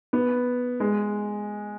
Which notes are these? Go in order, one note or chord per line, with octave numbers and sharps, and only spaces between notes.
B3
G#3